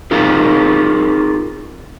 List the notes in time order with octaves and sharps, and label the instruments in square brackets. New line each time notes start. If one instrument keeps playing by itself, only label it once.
[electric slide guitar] C4 D#4 F4 G#4 A#4